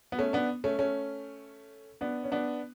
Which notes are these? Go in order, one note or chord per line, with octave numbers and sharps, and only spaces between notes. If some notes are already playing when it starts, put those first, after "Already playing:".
B3
A3 C#4
B3 D4
A3 C#4
A3 C#4
B3 D4
C#4
B3 D4